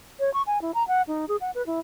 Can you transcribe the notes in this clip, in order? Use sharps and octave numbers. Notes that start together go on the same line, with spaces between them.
C#5
C#6
G#5
E4
A#5
F#5
D#4
G#4
F#5
B4
E4